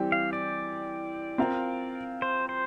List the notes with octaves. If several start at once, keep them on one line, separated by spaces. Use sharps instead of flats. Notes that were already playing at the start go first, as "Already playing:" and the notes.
Already playing: E3 G3 C4 G4
F5
D5
C4 F4 A#4 F5
C5
C5